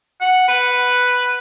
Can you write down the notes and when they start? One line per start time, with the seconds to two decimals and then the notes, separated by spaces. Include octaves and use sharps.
0.21 F#5
0.48 B4